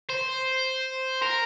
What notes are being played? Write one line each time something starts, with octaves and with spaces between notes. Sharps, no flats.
C5
A#4